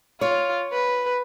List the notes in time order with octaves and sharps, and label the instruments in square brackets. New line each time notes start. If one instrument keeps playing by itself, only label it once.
[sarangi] F4 [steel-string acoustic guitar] C#5
[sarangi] B4